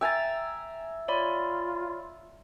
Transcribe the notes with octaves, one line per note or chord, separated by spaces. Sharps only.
E5 G5 G#5 A#5 A6
F4 C#5 D5 B5